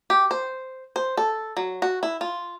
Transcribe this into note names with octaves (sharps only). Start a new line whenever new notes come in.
G4
C5
C5
A4
F#3
F#4
E4
F4